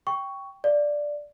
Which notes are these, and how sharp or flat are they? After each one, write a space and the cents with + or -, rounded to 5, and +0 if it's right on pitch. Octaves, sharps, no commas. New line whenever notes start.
G5 +0 C#6 +10
D5 +0 F5 -5